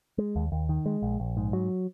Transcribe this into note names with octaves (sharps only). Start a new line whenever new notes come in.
G#3
D#2
D#2
D#3
G#3
A#1
A#1
G#2
F#3